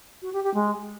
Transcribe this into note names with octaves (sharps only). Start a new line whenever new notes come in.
F#4
G4
G4
G#3